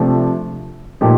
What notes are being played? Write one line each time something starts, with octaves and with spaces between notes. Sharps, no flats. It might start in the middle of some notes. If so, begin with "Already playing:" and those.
Already playing: C3 F3 A3 D4
A#2 F3 A3 D#4 G4